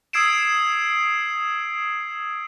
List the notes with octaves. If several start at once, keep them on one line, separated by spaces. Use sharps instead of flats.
D#6 E6 G#6 C7 D7 E7